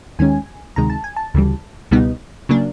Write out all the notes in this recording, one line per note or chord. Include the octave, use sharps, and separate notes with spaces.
D#2 D#3 G#3 C#4 G#5
D2 C3 D#3 G#3 A#5
A5
G#5
A5
D2 C#3 E3 G3
C#2 B2 G3 B3 D#4
C#3 F#3 A#3 D4